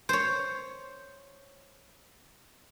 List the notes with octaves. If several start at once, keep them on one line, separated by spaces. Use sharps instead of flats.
C5 C#5